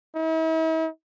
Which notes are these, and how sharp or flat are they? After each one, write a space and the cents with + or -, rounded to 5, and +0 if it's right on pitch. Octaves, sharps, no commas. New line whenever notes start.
E4 -45